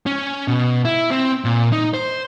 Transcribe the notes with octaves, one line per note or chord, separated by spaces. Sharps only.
C#4
B2
E4
C4
A#2
D#4
C5